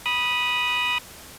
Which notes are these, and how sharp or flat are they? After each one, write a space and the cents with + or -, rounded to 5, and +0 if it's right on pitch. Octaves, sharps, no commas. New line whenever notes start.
B5 -15 D#6 +0